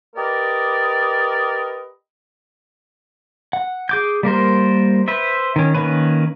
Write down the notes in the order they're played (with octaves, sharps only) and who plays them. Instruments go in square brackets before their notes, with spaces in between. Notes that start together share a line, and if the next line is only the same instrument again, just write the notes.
[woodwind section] G4 A#4 B4 D5 D#5
[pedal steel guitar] F#5
G#4 D6 G6
G3 A#3 A#4 C5
B4 C5 E5
D#3 C#4
D#3 A#3 C#4 B4